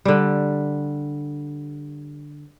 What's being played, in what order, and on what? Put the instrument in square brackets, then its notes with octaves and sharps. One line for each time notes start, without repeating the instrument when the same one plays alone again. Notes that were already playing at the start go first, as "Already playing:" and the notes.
[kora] D3 G3